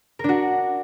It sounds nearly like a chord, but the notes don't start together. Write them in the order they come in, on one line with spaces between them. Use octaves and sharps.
A#4 D4 F#4